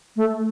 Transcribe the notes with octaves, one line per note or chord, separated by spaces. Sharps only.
A3